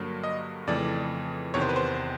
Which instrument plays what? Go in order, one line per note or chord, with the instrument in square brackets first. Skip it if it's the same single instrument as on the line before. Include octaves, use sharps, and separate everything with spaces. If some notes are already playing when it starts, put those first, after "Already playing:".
Already playing: [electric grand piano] G2 D3 F#3 A#3
D#5
F2 C#3 E3 A3 D5
E2 C3 D#3 C#5
C5
B4
C5